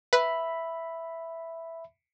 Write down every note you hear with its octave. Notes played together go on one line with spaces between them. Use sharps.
B4 E5 B5